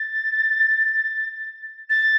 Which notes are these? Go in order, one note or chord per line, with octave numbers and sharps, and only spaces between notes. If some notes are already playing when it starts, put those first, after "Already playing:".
Already playing: A6
A6